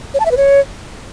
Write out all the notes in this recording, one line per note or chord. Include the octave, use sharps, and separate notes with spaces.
C#5
A5
E5
B4
C#5